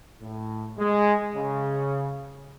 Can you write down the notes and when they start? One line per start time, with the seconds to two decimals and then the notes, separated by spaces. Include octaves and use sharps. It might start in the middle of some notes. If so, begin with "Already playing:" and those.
0.22 A2
0.79 G#3
1.35 C#3